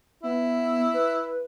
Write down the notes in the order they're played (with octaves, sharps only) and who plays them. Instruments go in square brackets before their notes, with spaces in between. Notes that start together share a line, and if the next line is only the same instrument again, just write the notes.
[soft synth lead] B3 [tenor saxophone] E4
[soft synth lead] B4